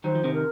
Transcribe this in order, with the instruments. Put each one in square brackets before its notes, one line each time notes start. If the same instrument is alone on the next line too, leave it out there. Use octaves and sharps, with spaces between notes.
[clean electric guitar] D#3 F#3 [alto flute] C5
[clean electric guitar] F3
C3 D#3
[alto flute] A#4